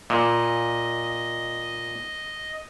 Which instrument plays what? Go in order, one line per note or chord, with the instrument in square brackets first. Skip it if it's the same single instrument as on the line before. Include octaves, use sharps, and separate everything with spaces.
[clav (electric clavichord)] A#2 [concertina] D#5